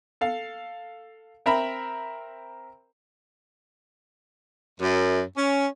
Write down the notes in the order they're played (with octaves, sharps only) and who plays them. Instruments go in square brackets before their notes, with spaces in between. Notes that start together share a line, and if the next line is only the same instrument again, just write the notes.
[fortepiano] A4 F5
C4 A#4 E5 A#5 B5
[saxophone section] F#2
C#4